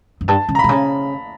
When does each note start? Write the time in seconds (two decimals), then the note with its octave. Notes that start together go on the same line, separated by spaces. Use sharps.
0.21 F#2
0.28 G2 A5
0.49 C#3
0.55 A#5
0.59 C3 B5
0.69 C#3